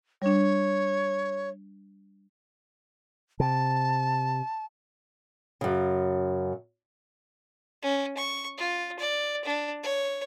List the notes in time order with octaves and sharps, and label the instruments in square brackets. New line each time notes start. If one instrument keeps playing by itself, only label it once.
[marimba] G3 D4 [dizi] C#5
[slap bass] C3 [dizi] A5
[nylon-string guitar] F#2 C#3
[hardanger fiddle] C#4
C#6
F4
D5
D4
C#5